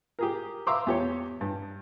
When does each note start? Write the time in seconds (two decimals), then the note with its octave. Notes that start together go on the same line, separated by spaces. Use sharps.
0.19 G4 G#4 A#4
0.67 E5 F5 A#5 C6 D6 E6
0.87 E2 G4 C#5
1.41 G2